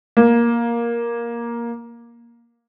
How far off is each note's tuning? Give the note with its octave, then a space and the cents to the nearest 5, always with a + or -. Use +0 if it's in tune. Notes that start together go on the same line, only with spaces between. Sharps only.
A#3 +10